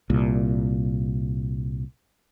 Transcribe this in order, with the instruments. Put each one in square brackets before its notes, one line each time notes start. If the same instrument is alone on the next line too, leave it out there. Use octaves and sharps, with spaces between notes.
[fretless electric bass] C2 A#2